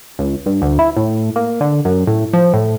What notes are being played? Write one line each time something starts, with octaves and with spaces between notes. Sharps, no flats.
C#2
G2
D2
E4
A2
A#3
D3
F#2
A2
F3
A2